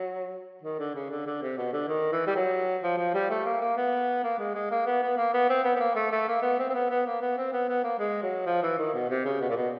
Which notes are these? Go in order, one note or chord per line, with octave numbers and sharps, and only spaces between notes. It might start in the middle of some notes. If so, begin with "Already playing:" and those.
Already playing: F#3
D#3
D3
C#3
D3
D3
C3
B2
D3
D#3
E3
G3
F#3
F3
F3
G3
A3
A#3
A#3
B3
A#3
G#3
G#3
A#3
B3
B3
A#3
B3
C4
B3
B3
A#3
A3
A3
A#3
B3
C4
C4
B3
B3
A#3
B3
C4
B3
B3
A#3
G#3
F#3
F3
E3
D#3
B2
C3
C#3
B2
A#2
B2